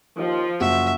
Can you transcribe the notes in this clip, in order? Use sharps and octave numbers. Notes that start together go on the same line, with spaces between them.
D#2 F3
F#1 F#4 E5